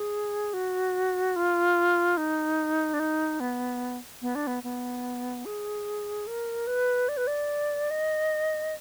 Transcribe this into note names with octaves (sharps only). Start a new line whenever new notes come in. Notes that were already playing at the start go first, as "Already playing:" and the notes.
Already playing: G#4
F#4
F4
D#4
D4
D#4
B3
B3
D4
B3
B3
G#4
A#4
B4
D5
B4
D5
D#5